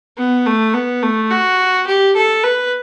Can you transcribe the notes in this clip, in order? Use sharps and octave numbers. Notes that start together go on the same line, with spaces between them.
B3
A3
B3
A3
F#4
G4
A4
B4